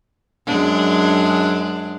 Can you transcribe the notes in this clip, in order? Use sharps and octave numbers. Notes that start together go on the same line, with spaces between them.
F#2 G#3 D4